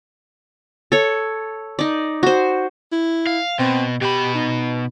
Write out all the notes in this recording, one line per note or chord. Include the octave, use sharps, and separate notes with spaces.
A4 C#5
D#4 D5
F#4 C5
E4
F5
B2 C4
B2 G4 B5
D#4